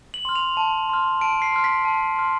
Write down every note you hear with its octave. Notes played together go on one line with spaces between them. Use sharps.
F#7
C6 F6
F7
A5
C6 F6
A5 D7
C7
C6 F6
B6
A5
C6 F6